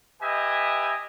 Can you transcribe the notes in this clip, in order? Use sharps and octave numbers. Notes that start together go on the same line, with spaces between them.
G4 B4 D#5 E5 G#5